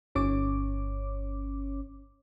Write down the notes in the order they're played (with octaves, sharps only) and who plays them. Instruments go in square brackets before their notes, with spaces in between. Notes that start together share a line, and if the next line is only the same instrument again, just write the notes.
[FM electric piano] G1 C#4 C#5 D6